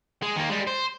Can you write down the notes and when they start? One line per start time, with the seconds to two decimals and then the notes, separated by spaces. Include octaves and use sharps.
0.22 G#3
0.36 D#3 A#3
0.49 G3 G#3
0.67 C5